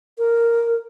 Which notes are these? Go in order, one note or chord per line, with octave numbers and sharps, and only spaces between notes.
A#4